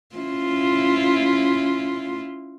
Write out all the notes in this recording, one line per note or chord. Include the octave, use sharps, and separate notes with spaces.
C#4 E4 F4